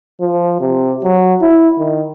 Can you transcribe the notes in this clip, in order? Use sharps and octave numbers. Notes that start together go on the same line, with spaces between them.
F3
C3
F#3
E4
D#3